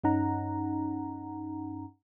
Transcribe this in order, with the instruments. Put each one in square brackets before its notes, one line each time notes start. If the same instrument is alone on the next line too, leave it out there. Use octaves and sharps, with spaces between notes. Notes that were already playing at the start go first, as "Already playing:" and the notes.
[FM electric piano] G2 C#4 D#4 F#5 A#5